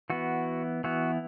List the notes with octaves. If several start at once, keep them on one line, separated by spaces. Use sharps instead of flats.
E3 B3 F#4
E3 B3 F#4